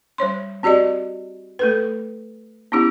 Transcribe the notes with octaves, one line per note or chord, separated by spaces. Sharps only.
G3 C5 C#5 C6
C4 F#4 G4 D5 D#5
A3 A4 B4
B3 C#4 E4 G4